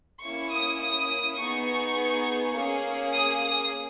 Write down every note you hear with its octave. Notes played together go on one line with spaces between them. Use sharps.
A#3 C#4 E4 C#6
D#6
D#6
B3 D#4 G#4 C#6
A#3 C#4 G#4
D#6
D#6